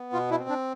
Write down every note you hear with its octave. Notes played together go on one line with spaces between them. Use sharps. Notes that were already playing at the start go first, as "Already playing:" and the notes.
Already playing: B3
B2 F4
E4
C4
D4